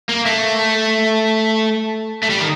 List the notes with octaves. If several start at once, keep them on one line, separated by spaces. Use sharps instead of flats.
A#3
A3
A3
G3
D#3